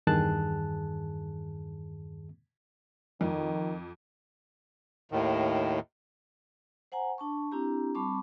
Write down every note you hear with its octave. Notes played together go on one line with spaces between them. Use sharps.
E2 G2 D#3 G#4 A5 F#6
F2 D#3
D#2 A2 D#3
C5 F#5 G#5 A#5
D4 A5 C#6
C4 D4 E4 G4 A#5
G3 C4 A5 B5 C#6 D6